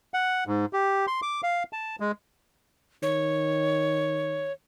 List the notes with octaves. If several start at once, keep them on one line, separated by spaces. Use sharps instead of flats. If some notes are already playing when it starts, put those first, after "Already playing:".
F#5
G#2
G4
C6
D6
F5
A5
G#3
D#3 C#5